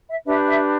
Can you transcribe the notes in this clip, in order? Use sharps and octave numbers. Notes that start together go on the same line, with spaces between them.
E5
D4 G4 B4 E5
E5